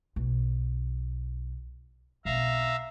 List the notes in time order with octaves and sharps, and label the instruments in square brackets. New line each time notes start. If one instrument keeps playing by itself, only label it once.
[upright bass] B1
[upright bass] B1 C4 [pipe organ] E5 F5 A#5